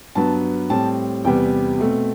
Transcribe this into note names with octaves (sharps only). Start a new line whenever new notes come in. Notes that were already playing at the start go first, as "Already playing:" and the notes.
G2 F#3 B3 A5
A2 G3 C4 A5
E2 C3 G3 B3 G5
B2 A3 C4